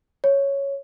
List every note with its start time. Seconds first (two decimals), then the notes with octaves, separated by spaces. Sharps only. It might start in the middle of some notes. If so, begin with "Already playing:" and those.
0.24 C#5